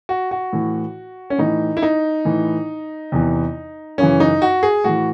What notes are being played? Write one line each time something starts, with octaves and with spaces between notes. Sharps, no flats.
F#4
F#4
A2 E3
C#4
A2 E3 D#4
E4
D#4
A2 E3
E2 C3 E3
F#2 C#3 E3 C#4
D#4
F#4
G#4
A2 E3 F#4